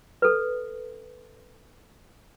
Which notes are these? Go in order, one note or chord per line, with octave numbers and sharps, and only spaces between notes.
A4 B4